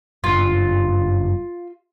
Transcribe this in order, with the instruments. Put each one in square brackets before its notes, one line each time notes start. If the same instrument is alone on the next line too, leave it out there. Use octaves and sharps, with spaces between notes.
[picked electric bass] F#1 G2 [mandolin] F4